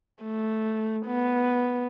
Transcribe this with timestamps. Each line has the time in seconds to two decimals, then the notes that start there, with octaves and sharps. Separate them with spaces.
0.23 A3
1.06 B3